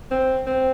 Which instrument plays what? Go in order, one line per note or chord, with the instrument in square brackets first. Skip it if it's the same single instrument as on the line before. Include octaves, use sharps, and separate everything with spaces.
[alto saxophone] C4
C4